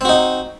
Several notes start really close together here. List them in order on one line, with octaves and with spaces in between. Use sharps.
C4 F#4 D#4